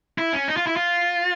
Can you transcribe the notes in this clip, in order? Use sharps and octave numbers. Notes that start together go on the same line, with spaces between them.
E4
C#4
D#4
F4
E4
F4